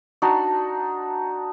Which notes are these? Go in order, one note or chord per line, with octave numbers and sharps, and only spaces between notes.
D4 D#4 F#4